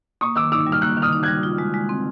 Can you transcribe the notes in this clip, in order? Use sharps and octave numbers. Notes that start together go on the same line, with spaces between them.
A#3 C#6 D#6
D#3 D6 E6
D#4 D6 E6
G3
F6
A#3 E6 F#6
D#3
D#6 F6
D#4
G3 F#6 G#6
F4
G#3
G#3
C4